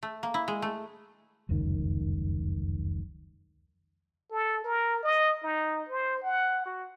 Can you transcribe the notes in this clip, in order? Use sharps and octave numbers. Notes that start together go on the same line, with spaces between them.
A3
A#3
E4
G#3
A3
F1 C#2 F#2 D#3
A4
A#4
D#5
D#4
C5
F#5
F#4